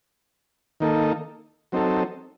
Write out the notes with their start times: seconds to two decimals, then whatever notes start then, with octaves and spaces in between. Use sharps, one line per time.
0.80 D#3 A#3 D#4 A4
1.72 F#3 C4 D#4 A4